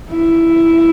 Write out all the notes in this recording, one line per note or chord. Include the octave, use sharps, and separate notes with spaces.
E4